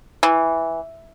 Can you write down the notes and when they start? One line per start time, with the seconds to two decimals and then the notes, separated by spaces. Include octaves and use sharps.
0.23 E3